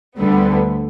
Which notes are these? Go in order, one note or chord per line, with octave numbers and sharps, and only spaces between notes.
D2 D3 G3 B3